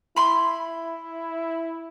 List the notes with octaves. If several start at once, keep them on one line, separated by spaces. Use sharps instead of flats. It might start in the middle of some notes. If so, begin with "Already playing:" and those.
E4 B5 C6